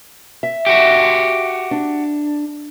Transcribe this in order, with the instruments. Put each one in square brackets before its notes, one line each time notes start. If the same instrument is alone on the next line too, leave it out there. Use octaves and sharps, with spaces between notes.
[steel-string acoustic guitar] E5
[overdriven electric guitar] F#4 G4
[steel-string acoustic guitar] D4